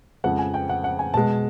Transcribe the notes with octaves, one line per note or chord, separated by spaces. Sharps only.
F2 C#3 F3 G#3 F#5
G#5
G5
F#5
F#5
G#5
B2 G#3 A5